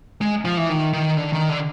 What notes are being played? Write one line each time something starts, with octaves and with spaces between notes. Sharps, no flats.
G#3
F3
E3
D#3
D#3
D3
D#3
D3